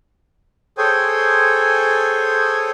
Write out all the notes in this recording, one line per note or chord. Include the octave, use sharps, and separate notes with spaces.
G#4 A4 C5 C#5 G5 G#5